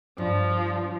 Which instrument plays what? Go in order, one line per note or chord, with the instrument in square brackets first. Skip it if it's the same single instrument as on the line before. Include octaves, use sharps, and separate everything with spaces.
[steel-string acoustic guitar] G2 [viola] F3